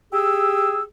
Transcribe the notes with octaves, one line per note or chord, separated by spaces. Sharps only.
G4 G#4 E6